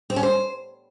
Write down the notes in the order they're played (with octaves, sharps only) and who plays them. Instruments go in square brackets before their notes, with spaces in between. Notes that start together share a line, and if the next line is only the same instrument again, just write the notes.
[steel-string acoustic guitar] C4
C#4
C5